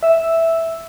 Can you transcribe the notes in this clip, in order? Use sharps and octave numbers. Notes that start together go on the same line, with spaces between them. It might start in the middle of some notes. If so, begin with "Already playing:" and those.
E5 E6